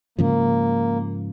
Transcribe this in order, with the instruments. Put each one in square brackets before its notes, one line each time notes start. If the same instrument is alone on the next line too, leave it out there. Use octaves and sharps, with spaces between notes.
[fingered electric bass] G#2 C#3 F3 [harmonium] A#3